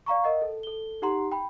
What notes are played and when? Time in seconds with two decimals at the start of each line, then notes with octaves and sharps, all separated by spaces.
0.06 D5 F5 A#5 C#6
0.24 A#4 D#5 F#5
0.42 A4
0.63 A4 G7
1.02 D#4 G4 F#5 A#5 C6
1.32 G5 B5